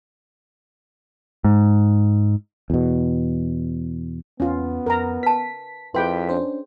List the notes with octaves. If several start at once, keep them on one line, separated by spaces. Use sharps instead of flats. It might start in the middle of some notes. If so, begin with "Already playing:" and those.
G#2
E2 B2
E2 B3 C#4 F4
F2 A#4 A#5
B4 A5 B6
F2 E4 G#4 B4 G5 C6 B6
C#4 D4 C5